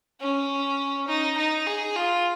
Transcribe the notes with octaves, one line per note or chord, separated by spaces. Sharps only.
C#4
D#4
D#4
G#4
F4